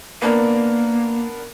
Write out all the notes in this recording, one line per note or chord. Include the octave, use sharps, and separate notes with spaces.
A#3 B3 D4 A#4